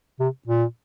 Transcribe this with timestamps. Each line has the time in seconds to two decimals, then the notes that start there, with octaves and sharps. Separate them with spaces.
0.20 C3
0.47 A#2